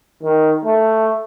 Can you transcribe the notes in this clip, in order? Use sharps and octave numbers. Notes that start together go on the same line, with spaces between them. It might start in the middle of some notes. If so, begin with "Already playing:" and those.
D#3
A3